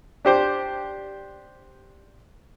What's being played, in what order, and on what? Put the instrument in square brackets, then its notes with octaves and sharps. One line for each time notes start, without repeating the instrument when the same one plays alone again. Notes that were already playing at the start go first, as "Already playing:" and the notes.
[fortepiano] D4 G4 C5